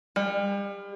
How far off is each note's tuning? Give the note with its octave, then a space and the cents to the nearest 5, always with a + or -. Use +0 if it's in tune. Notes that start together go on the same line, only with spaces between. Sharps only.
G3 +35